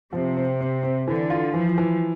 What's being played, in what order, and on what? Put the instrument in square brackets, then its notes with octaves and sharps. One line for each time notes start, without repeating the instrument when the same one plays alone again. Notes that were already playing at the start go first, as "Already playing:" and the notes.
[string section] C3 [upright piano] F3
[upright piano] C4
C4
C4
[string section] D3 [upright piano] E3
[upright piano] F4
[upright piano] E3 [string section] F3
[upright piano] E3